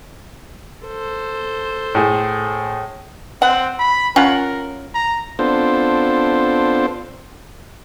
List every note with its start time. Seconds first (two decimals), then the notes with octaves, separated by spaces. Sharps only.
0.85 A4 C5
1.95 A2 G#4
3.42 C4 F#5
3.79 B5
4.16 C#4 F4 A#4 F#5
4.94 A#5
5.39 B3 C4 D4 F4 A4 C5